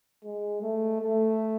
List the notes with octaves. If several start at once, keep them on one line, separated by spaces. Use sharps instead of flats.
G#3
A3
A3